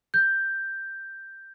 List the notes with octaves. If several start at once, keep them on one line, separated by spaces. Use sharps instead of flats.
G6